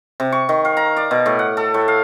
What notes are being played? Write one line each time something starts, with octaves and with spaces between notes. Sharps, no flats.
C3
C#6
D#3
F5
A#5
D5
B2
A2
F#5
A4
A2
F5